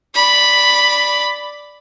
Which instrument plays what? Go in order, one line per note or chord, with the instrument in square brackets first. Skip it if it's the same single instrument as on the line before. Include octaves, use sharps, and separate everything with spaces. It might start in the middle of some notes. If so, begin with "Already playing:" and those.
[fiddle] D5 B5